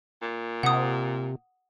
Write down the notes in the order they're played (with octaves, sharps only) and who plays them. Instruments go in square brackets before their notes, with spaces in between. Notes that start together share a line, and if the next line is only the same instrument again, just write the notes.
[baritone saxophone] A#2
[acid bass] C3 [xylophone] F#5 D#6